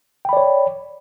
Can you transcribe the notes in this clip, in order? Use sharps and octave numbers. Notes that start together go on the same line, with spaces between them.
C#5 D5 G5 B5